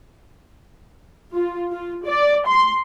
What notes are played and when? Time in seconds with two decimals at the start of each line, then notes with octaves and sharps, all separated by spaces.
1.35 F4
1.73 F4
2.06 D5
2.48 C6